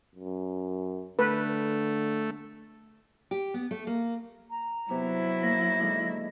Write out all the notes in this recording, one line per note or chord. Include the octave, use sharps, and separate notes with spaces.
F#2
D3 A3 B4
G4
B3
A3
A#3
A#5
C3 F#3 B3 E4
A#3 A#6
D3 D#3 G#3